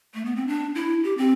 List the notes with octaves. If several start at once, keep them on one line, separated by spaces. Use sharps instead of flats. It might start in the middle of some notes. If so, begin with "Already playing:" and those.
A3
B3
C4
D4
E4
G4
C4